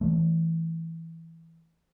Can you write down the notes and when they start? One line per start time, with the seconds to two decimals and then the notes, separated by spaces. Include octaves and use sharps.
0.01 E3 A3